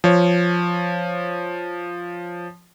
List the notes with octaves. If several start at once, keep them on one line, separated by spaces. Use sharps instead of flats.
F3 C#5